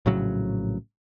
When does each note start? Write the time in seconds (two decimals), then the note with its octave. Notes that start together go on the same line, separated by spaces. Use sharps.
0.06 A#1 A2 C#3 F#3